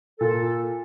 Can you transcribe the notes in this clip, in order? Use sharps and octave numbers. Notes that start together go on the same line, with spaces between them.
A#2 A4